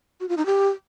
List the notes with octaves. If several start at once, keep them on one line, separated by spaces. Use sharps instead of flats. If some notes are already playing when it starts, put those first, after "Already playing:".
F#4
F4
D#4
G4